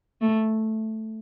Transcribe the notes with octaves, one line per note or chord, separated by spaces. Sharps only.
A3